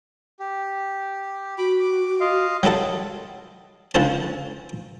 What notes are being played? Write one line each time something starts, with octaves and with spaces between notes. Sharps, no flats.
G4
F#4 B5 D6
D6
F4 D#5 F5
F#3 G3 E4 A4 F#5
C#2 D3 F3 E4 C5 A5